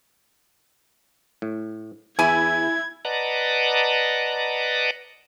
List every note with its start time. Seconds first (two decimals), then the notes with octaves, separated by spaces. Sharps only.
1.42 A2
2.19 E2 E4 G#5 G#6
3.05 B4 D5 D#5 F#5 A5 A#5